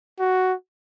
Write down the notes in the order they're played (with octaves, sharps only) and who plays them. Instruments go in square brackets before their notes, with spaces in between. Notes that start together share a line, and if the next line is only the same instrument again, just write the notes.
[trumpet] F#4